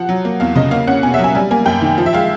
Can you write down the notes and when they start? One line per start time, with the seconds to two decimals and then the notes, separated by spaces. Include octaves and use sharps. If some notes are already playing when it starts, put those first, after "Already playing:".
Already playing: F3 F#5
0.09 F#3
0.25 A#3
0.40 E2 F5
0.56 C#3 D#5
0.71 A#3 F5
0.87 C#4 F#5
1.03 B2 G#5
1.14 F#3 E5
1.24 G#5
1.35 G3 G#5
1.51 A#3 G#5
1.66 F#2 G5
1.82 D#3
1.98 F3
2.06 E5
2.13 G#3 F5